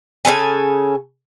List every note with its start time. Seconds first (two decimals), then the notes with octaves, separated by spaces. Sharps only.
0.25 C#3 B3 A4 G#5